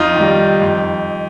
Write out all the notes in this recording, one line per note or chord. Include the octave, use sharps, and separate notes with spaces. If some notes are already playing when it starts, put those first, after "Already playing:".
Already playing: F2 D#4 F4
D#3 G3
F2